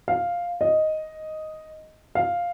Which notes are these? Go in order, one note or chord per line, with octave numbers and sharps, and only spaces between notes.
F5
D#5
F5